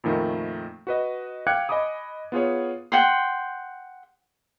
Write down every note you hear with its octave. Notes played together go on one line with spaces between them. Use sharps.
F2 A#2 D#3 A3
F#4 B4 D#5
F5 G5 D6 F#6 G#6 C#7
D#5 G#5 B5 D6 D#6
B3 F4 G#4 C#5
F#5 G5 C6